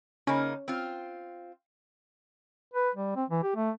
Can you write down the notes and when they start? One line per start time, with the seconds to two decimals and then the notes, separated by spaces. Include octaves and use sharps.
0.27 C#3 A#3 C#4 D#4
0.68 C4 F4
2.73 B4
2.95 G3
3.16 C4
3.30 E3
3.43 G4
3.55 A3